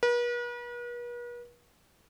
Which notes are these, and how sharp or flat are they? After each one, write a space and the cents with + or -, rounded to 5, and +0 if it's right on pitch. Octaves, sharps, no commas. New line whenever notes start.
B4 -45